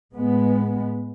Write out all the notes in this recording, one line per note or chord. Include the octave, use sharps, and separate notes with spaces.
A2 G#3 B3